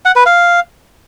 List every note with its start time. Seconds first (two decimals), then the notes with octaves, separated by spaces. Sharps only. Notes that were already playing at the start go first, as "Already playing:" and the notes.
0.05 F#5
0.16 B4
0.26 F5